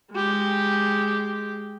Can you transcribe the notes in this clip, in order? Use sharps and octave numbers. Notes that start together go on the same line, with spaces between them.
G#3 G4